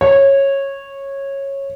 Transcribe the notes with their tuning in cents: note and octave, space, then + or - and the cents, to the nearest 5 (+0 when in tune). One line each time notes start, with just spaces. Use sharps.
C#5 -15